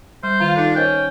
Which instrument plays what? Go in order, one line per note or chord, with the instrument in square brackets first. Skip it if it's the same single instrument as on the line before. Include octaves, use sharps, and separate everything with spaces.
[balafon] G3 [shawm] C5
[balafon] D#3 [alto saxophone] F4
[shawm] D4 [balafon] D#4 A4
[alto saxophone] C#4 [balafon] A#4 C5 D#5 [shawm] G5